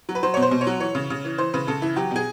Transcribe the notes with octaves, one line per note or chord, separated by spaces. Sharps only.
F#3
B4
F#3 C5
C#5
B2
C5
B2
C#5
F#3
E3 C#5
C#3
C#3
E3
E3 C5
C#3 B4
C#3 A4
E3 E4
F#3 G4
B2 G#4